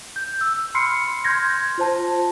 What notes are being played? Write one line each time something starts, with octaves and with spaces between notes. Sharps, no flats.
G6
E6
B5 C6 F6 C7 C#7
C6 F6 G6 G#6 A#6
F4 C5 A5